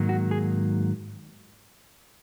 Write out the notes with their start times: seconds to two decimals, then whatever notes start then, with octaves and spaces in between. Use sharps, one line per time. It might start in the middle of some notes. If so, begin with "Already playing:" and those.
Already playing: G#2 D#3 F#3 A#3
0.09 F#4
0.31 G#4